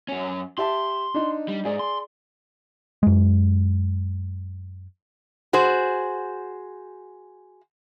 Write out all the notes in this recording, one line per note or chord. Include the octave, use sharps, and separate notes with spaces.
F#2 C#4
G4 E5 A5 C6
D4 D#4
G3
G#2 G#4 D5
C6
F#2 G#3
F#4 G#4 C5